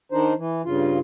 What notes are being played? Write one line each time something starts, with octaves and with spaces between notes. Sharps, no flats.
D#3 D4 D#4 C5
E3
G2 C#3 F4